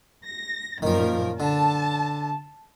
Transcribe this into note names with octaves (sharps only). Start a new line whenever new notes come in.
A#6
F#2 A#2 D#3 F3 A#4
D3 A5